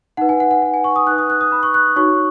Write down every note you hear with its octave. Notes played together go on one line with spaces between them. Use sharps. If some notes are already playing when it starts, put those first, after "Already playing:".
D#4 B4 F#5
G#5
F#5
F#5
F#5
G#5
C#6
D#6
D#4 B4 F#6
D#6
F#6
D#6
B5
C#6
F#6
D#4 F#4 C#5 C#6